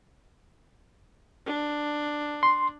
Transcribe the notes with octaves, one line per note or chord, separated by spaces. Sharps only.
D4
C6